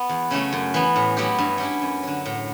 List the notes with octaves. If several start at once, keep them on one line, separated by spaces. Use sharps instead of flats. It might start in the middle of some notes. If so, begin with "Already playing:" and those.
Already playing: B3 F#4
E2
C#3 F#3 A3 C#4
F#2
E3 B3
A2
F#3 B3 E4 G4
G2
F#3 C#4 E4 G4
F#2
D3 F#3
A2